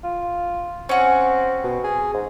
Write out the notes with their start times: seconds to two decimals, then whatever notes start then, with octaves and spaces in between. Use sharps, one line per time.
0.04 F4
0.89 C4 C#4 F#4
1.64 B2
1.84 G#4
2.14 G#2